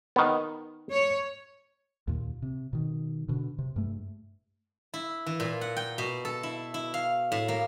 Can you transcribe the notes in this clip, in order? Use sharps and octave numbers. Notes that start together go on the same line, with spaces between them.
D#3 B3
C#5
D#2 A#2
C3
B2 D#3
B2 D3
C3
G2 A3
E4
E3
A#2
F#5
G5
B2
A4
E4
E4
F5
A2
A#3